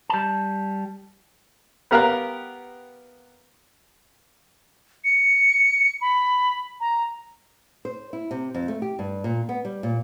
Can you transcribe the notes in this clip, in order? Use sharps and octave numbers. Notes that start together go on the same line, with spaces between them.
G3 A5
B3 G4 A#4 F5 A#5 F#6
C#7
B5
A#5
C5
E4
C3
F2
A3
G4
G2
A#2
B3
G3
A#2